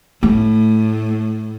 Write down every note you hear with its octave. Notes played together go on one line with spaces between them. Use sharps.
A2 A3